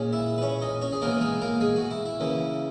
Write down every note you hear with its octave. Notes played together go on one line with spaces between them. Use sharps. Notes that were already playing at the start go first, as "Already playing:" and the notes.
Already playing: A#2 G#3 C#4
E4 E5
B4
C#4 C#5
D#4 D#5
C#4 C#5
G#4
G#2 E3 A#3 B3 D#4 A#4
G#3 G#4
A#3 A#4
G#3 G#4
F#4
E4
E4
C#3 E3 A#3